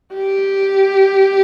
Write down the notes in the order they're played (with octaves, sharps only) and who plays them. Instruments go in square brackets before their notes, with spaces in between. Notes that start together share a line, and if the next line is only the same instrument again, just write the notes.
[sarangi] G4